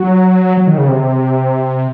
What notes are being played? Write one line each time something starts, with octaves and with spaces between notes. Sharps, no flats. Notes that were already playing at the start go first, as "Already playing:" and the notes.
Already playing: F#3
F#3
D#3
C#3
C3